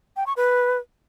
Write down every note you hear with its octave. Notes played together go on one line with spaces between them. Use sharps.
G5
C#6
B4